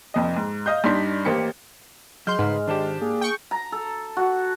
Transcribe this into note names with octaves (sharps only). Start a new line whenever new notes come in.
F1 F2 D#5
G#2
D#5 F5 G6
G2 D4 D#4 C6 B6
A1 A#3 G4 C5 C#7
F#3 G#3 C6 F6 G6
G#2 C#3 B4
D#3 D4 G4 C5 A5
A#3 G#4
G5 C#6
A#5
A4
F#4